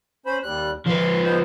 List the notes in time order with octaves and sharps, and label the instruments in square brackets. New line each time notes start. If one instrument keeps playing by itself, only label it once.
[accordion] C#4 C5 B5
D#2 G3 F#6
[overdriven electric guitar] F3 B4 [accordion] C6
[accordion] G#3 B3 C5